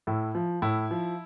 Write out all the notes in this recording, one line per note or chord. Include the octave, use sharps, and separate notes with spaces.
A2 E4
F3
A2 E4
F3